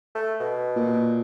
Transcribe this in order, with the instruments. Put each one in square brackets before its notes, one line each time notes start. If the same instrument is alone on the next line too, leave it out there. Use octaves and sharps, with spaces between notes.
[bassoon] A3
B2
[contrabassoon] A#2